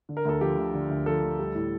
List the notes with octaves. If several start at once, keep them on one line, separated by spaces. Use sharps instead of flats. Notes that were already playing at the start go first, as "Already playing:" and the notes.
D3
A#4
D2 A4
F3 G4
D2
D3
D2
F3 A4
D2
G3
A2